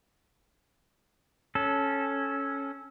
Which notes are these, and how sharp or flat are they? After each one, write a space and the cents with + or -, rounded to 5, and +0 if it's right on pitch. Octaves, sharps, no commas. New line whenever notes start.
C#4 +0 A4 -15